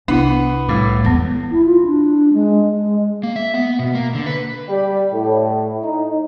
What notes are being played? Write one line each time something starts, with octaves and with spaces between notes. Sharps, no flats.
C2 B3 D4 E4
A2 G3 D6
E2 G#3 B3
E4
F4
D4
G#3
G#3
A#3
E5
B3
B2
A#3
D3
B4
G3
A2
D#4